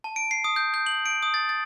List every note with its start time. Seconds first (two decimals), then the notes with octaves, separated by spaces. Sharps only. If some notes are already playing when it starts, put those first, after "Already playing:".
0.04 A5
0.16 D7
0.31 C7
0.44 D#6
0.56 G6
0.74 G6
0.86 F#7
1.06 D7
1.23 D#6
1.34 A6
1.49 A6